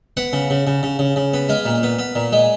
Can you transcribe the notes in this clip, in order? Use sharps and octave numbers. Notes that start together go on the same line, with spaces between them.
B3 F#5
C#3
C#3
C#3
C#3
C#3
C#3
B3
G#3 F5
A#2
B3
B3
A#2
G#3